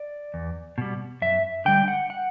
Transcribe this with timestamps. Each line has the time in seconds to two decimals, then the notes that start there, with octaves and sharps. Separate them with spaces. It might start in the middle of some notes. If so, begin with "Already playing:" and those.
Already playing: D5
0.34 E2
0.78 B2 G3
1.22 F#2 E5
1.65 D3 G3 G5
1.88 F#5
2.10 F#5